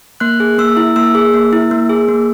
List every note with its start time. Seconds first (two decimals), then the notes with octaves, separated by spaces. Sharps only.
0.20 A#3 F#6
0.40 G#4
0.58 A#3 E6
0.77 E4
0.96 A#3 E6
1.15 G#4
1.34 A#3
1.53 E4
1.71 A#3
1.90 G#4
2.09 A#3